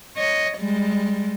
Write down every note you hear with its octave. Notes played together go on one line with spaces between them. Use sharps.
C#5 D#5
G3 G#3